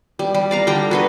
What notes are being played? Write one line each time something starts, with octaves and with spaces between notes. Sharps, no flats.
G3
G3
D5 F5 A#5
D3 G3 G5 A#5
F#4 B4 D#5